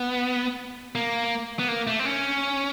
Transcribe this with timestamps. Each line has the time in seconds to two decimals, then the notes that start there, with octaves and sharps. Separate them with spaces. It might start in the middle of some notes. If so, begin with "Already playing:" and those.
Already playing: B3
0.95 A#3
1.59 B3
1.68 A#3
1.87 A3
1.99 C4
2.05 C#4